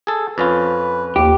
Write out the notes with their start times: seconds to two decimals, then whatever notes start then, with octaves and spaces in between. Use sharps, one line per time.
0.07 G#4 A4
0.38 F2 C#4 F4 B4
1.16 D#2 G4